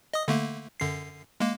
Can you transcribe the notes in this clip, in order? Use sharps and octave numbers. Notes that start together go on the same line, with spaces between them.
D#5 D#6
D3 A3 A#3
F#2 D3 C7
G#3 A#3